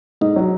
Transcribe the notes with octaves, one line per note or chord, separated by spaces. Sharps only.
G#2 D#4
F#3